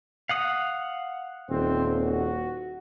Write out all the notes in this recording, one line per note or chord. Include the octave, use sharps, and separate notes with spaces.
F5 F#5 D#6
D#1 C4
F#4